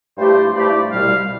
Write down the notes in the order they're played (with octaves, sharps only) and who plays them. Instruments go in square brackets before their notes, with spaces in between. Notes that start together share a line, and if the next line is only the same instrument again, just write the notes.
[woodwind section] G2 F3 A3 E4 G4 [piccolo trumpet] C5
[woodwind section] G2 F3 A3 E4 G4 [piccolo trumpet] D5
[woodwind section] C2 B2 G3 [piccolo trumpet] F5